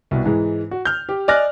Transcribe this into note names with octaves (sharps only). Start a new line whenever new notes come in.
C2 B2
G#2 E3 G#3
F#4
F6 G6
G4
D5 D#5 G#5 F6 F#6 A#6